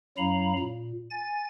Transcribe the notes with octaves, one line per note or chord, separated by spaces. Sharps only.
F#2 F#3 E4 F5 A#5 B5
A#2
G#5 A6